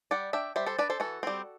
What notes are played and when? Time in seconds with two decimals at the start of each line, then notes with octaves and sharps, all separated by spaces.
0.11 G3 D5 F#5
0.33 D4 E5 G5
0.56 G3 C5 E5
0.66 A4 C5
0.78 D4 B4 D5
0.90 A4 C5
1.00 E3 F#4 A4
1.23 G3 C4